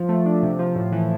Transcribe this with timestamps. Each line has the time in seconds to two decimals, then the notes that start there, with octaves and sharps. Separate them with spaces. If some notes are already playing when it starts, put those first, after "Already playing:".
Already playing: F3
0.09 A3
0.26 D4
0.43 C3
0.59 F3
0.76 A2
0.92 E3